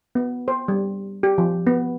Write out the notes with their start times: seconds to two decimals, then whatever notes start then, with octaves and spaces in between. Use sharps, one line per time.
0.15 B3
0.48 C5
0.68 G3
1.23 G4
1.38 F3
1.67 B3